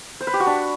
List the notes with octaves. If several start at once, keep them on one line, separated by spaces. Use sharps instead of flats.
C5
B4
G4
F#4
D4